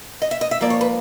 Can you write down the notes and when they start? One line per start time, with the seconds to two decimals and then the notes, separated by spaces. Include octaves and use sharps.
0.22 D#5
0.31 E5
0.41 D#5
0.51 E5
0.61 G#2 F3 A#3 D5
0.70 C#5
0.81 B4